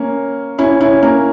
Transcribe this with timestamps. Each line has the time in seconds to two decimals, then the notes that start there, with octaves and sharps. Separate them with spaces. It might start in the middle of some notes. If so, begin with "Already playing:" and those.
Already playing: A#3 C#4
0.59 C#4 E4
0.80 C#4 E4
1.02 A#3 C#4